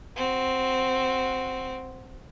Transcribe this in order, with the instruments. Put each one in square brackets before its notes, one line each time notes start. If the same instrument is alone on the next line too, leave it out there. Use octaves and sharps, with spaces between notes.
[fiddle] C4 F#4